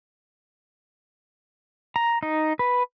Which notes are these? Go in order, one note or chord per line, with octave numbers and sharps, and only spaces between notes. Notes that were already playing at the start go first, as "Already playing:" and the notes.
A#5
D#4
B4